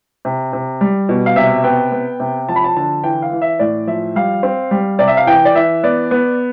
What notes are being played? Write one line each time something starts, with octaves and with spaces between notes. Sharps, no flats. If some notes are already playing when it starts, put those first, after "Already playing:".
C3
C3
G3
B2
F5
C3 E5
B3 G5
B3
C3
F3 A5
B5
A5
D3 A5
E3 G5
F5
E3
E5
A2 D5
F3 E5
G3 F5
C4
G3
C3 D5
E5
F5
E3 G5
D5
E3 E5
B3 D5
B3